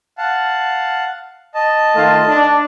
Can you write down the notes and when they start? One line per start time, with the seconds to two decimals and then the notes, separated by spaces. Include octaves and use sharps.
0.18 F5 F#5 A5
1.54 D#5 A5
1.96 D#3 A3 F4
2.28 D4